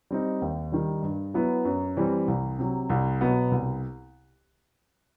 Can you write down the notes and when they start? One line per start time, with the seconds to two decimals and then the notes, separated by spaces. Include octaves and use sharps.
0.11 G3 C4 D#4
0.42 D#2
0.72 D#3 G3
1.03 G2
1.34 F#3 B3 E4 B4
1.65 F#2
1.97 E3 G3 C4
2.28 C2
2.59 C3 F#3
2.90 C2
3.21 B2 F#3 B3
3.52 C2